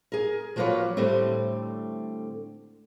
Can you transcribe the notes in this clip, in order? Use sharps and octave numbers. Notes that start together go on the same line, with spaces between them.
G#4 A#4
F3 F#3 A#3 F4 B4 C#5
A2 D3 G3 A3 C4